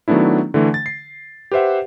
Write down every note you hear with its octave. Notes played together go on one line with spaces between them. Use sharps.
D#3 F#3 A3 B3 D4 E4
D3 E3 A3
A6
C7
G4 B4 C5 E5 F#5